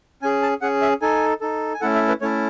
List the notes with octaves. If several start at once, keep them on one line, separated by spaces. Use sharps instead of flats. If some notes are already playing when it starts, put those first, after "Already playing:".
C#4 G#4 G#5
A5
C#4 G#4 F#5
E5
D#4 A4 G#5
D#4 A4
G#5
A3 C#4 E4 A4 F#5
E5
B4
A3 C#4 E4 A4 C#5